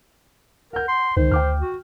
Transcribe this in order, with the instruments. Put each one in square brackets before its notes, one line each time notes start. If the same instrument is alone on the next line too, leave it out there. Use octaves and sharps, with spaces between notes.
[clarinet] A#4 [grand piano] F#5 G6
[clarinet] C6
[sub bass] C#2 [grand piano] D#3 [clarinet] C5
[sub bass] D2 [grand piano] G5 D6 F6
[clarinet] F#4